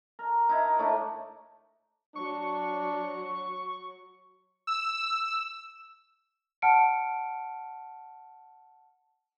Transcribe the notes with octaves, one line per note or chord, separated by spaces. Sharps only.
A#4
D#4 E4
A2 A3 D4 D#4
F#3 D4 C#6
E6
F#5 A5 F6 C#7 D7